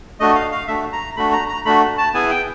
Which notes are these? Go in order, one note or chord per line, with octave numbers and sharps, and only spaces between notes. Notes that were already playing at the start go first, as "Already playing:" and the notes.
A3 D4 F#4 D#5
F5
F5
A3 D4 F#4 E5
A#5
A3 D4 F#4 B5
A#5
A#5
A3 D4 F#4 B5
A5
B3 E4 G#4 G#5
G5